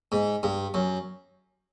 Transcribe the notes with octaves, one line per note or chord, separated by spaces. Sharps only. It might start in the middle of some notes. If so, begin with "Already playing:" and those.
G#2
G2
F#2